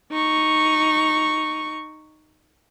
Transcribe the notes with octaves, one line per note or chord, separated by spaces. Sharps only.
D#4 C#6